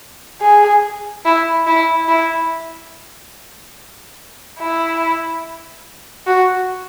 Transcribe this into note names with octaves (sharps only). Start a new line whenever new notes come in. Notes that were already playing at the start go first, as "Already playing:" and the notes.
G#4
E4
E4
E4
E4
F#4